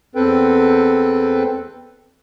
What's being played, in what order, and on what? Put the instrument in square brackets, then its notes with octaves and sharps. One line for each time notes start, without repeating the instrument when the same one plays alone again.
[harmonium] E2 C4 A4 B4 G5